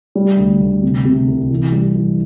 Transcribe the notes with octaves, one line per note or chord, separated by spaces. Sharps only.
G3
D2
D2
C3
C3
C2
E3
G3
E3